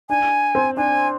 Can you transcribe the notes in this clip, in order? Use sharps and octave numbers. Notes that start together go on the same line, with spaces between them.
D4 G#5
C4
D4 G#5